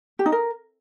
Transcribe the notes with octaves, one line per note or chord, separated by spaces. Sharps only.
G4
D#4
A#4